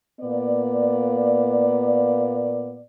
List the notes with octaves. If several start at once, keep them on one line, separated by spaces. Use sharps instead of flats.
A#2 A#3 B3 D5